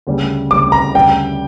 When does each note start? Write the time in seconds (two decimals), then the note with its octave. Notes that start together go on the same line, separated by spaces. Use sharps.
0.07 D2 C#3 G3
0.51 D2 C#3 G3 D6
0.72 A#5
0.94 D2 C#3 G3 G5